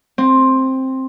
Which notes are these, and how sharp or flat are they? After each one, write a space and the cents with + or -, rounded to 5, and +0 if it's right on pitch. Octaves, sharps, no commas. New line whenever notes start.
C4 +10